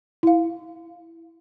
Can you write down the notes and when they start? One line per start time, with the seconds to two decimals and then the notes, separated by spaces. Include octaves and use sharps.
0.23 E4 F5